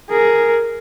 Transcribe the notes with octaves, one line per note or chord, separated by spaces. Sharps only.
G#4 A#4